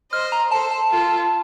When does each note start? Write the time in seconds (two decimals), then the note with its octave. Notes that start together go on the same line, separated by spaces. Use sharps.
0.13 C5 D#5 F6
0.32 A#5
0.51 A4 C5 A5
0.71 A5
0.90 F4 A4